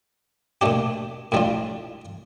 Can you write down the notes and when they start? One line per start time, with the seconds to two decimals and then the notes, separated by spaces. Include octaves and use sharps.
0.61 A#2 A3 D4 G4
1.32 A2 G3 D4 F4